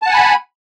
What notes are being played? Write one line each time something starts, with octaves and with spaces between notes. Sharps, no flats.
F#5 G#5 A5 B5